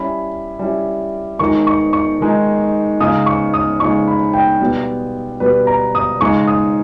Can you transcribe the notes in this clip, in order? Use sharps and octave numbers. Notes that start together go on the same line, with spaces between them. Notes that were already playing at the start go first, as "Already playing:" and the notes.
Already playing: G3 C#4 E4 B5
G3 C#4 E4
D#3 G#3 D#4 C#6
C#6
C#6
D#3 G#3 D#4
C#3 G#3 D#4 D#6
C#6
D#6
C#3 G#3 D#4 C#6
B5
G5
B2 G3 B3
B2 G3 B3 B4
A#5
D#6
C#3 G#3 D#4 C#6
D#6